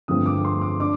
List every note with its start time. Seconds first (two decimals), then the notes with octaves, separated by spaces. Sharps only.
0.08 G2 D3 F3 A3 C4 D#6
0.26 D6
0.45 C6
0.61 D6
0.80 D4 D6